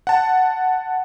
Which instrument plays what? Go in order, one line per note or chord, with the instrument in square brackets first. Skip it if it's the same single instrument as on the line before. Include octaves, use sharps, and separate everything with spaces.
[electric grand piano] F#5 A5